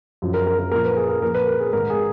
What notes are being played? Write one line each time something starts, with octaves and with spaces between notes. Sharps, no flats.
F#2 F3
A#4
A#4
A#4
A#2 F3 A#4
B4
G#4
A#4
A#2 F3 A#4
B4
A#4
G#4
G#2 D#3 A#4
G#4